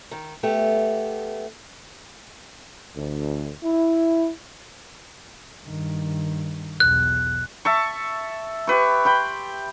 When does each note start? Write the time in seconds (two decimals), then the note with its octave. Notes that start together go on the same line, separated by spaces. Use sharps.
0.11 D#3
0.43 A3 B3 G4
2.96 D2
3.64 E4
5.65 G2 D#3
6.80 B1 E2 F#6
7.65 E5 A5 C#6
8.67 G4 B4 C#6
9.05 G5 B5 C6